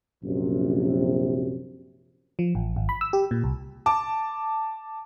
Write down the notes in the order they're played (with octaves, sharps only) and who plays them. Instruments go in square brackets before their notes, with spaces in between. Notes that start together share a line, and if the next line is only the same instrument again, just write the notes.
[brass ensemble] A#1 F#2 C3
[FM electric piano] F3
A1
G#1
B5
E6
G4
A#2
C2
[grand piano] A5 D6